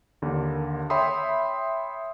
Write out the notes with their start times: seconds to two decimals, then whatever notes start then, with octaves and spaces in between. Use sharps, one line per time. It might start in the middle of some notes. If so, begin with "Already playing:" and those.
0.22 D#2 D3 A#3
0.90 C#5 E5 G5 B5 C6 D#6